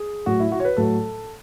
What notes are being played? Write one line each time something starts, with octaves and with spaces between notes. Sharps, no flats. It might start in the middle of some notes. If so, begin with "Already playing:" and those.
Already playing: G#4
A2 F#3 A3 F#4
E4
F#4
C#5
B4
A2 F#3 A3 A4